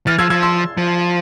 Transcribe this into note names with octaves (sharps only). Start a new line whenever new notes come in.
E3 F6 A6
F3 E6 G#6
F3 E6 G#6
C6 E6
F3